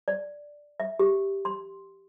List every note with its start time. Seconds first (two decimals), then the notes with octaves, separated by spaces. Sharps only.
0.08 D5
0.80 E5
0.99 G4
1.45 C6